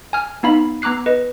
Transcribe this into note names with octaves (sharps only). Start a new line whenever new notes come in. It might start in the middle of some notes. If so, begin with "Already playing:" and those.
G#5 F6
B3 D#4 F5 B5
B3 A#5 D6 F#6 C7
B4 D#5